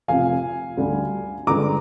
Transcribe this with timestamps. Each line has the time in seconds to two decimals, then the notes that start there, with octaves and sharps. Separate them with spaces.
0.08 F1 F2 C3 F5 G#5
0.77 D2 D3 G3
1.47 G1 G2 D3 G#3 A#5 D6